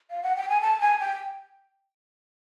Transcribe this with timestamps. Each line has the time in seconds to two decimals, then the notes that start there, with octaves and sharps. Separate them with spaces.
0.10 F5
0.23 F#5
0.36 G5
0.49 G#5
0.61 A5
0.81 G#5
1.00 G5